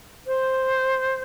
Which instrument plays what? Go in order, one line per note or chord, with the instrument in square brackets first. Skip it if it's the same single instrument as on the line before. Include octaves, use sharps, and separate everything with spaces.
[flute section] C5